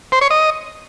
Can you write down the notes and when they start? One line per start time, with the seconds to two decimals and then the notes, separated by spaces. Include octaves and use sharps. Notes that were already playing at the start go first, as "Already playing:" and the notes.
0.12 C5
0.21 C#5
0.31 D#5